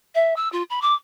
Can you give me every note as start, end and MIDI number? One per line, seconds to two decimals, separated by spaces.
0.15 0.34 76
0.36 0.50 88
0.52 0.63 65
0.70 0.81 83
0.82 0.94 86